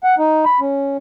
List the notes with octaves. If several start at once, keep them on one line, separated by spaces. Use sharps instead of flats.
F#5
D#4
B5
C#4